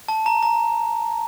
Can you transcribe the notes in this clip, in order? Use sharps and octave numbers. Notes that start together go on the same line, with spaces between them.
A5
A#5
A#5